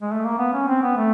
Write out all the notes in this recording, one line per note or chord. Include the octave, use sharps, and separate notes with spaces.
G#3
A3
A#3
B3
C#4
C4
B3
A3